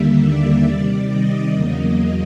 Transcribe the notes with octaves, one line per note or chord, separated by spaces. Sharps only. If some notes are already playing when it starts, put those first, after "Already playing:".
Already playing: D#2 D3 G3 A#3 E5
D5
C3 D#3 G3
D#5
E2 C#3 F#3 A#3